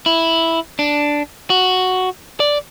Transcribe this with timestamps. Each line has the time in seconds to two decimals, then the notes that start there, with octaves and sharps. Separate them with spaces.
0.06 E4
0.79 D4
1.50 F#4
2.40 D5